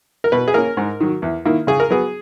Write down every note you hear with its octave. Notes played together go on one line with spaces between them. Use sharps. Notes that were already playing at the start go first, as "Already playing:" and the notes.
A#4
B2 B4
G#4
A#3 C#4 A#4
G#2
D#3 F#3
E2
D#3 A#3 E4
C#3 G#4
A#4
F#3 B3 G#4